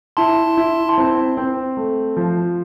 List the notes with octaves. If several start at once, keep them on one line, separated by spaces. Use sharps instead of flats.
E4 A5 C6
E4
C4
C4
A3
F3